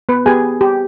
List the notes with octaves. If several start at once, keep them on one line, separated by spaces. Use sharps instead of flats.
B3 B4
B3 G4 G#4 G#5
G4